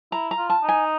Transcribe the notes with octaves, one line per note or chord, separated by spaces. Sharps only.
E4 A#5
A#5
F4
A5
D#4
G#5